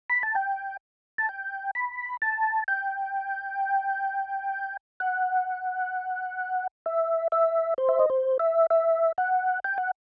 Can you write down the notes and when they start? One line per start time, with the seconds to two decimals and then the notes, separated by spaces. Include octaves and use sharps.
0.10 B5
0.23 A5
0.35 G5
1.18 A5
1.29 G5
1.75 B5
2.22 A5
2.68 G5
5.00 F#5
6.86 E5
7.32 E5
7.78 C5
7.89 E5
7.99 D#5
8.10 C5
8.39 E5
8.70 E5
9.18 F#5
9.64 G5
9.78 F#5